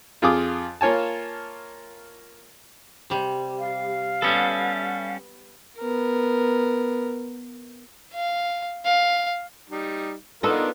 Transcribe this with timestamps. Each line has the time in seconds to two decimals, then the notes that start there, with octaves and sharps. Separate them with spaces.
0.22 F2 F4 G#4 D6 D#6
0.81 A#3 F4 C#5 G#5 A5
3.10 C3 G3
3.59 F5
4.22 G3 B3 C#4 A4
5.79 B3 A#4
8.13 F5
8.85 F5
9.70 G3 D#4
10.43 B3 D4 D#4 F4 A4 A#4